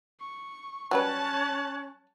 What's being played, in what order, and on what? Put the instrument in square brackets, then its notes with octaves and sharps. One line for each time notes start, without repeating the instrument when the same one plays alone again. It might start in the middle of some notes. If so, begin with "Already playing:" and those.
[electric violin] C#6
[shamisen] F#3 G3 B4 [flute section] C#4 [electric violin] A5 F#6